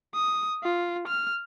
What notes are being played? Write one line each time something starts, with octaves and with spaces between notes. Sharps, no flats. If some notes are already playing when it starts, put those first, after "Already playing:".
D#6
F4
F6